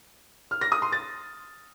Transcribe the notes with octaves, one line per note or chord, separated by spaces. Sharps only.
F6
A#6
D#6
C6
A6